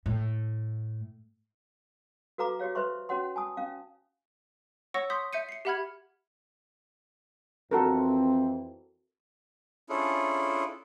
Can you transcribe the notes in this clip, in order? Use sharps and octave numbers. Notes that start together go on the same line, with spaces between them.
A2
F#4 A4 B4 F5 A#5 D6
F#4 G4 C#5 F5
B4 C5 E5 C6 C#6
C#4 F#4 C#5 F#5 C6
G#5 A5 D#6
C#4 F5
C#5 F#5 C#6 E6 A#6 C#7
C6 D#6 G6 B6
E5 G6 C#7 D#7
C7 C#7
G4 E5 F#5 B5 F6 G#6
F2 E3 C4 F#4 A4 A#4
C#4 D4 E4 F4 G#4 A4